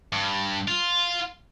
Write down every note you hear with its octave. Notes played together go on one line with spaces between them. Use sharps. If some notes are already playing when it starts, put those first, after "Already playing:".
G2
F4